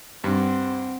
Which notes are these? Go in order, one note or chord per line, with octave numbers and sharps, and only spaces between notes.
G2 C4 F#5